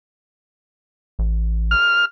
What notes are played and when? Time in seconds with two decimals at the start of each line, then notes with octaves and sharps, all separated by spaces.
1.19 A1
1.71 F6